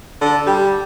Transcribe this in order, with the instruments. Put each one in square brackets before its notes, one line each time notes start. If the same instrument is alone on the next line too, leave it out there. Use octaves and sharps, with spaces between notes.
[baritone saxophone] D3
[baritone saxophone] G3 [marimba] G4 G5